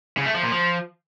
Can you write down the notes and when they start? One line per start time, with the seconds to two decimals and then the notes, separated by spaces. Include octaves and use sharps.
0.17 C#3
0.26 A3
0.34 F3
0.43 A#2
0.52 F3